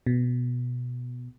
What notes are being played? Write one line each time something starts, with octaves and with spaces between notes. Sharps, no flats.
B2